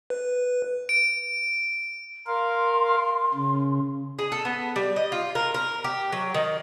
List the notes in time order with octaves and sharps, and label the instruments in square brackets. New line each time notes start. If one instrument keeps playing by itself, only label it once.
[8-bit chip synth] B4
[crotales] D7
[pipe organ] A#4 F5 [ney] C6
[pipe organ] C#3
[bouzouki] G#4
A4
B3
G3
D#5
F4
A#4
A#4
G4
F#3
D#3